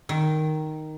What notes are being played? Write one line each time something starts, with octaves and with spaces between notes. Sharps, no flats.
D#3